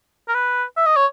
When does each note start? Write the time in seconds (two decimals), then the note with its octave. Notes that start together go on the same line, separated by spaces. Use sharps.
0.28 A#4
0.34 B4
0.77 E5
0.86 D#5
0.96 C#5